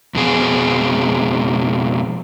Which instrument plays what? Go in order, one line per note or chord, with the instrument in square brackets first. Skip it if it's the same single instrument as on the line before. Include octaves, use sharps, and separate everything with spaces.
[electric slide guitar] F2 B2 G#4